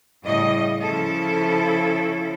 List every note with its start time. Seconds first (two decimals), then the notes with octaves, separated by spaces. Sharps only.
0.24 A2 C#3 G3 D#5
0.81 C#3 F3 E4 A4